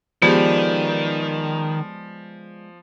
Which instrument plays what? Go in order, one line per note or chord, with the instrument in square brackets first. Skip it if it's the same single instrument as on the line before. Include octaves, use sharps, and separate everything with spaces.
[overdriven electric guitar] D#3 [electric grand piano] F3 [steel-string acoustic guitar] G#3 B4 D5 [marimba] B3 G4 G#4